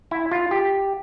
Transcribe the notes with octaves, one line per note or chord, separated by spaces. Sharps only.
E4
F4
G4